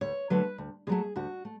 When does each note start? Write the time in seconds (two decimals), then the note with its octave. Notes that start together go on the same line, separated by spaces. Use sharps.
0.01 D2 C#5
0.30 D3 F#3 A3 B4
0.58 D2
0.87 D3 F#3 A3 G#4
1.16 D2 F#4
1.45 A3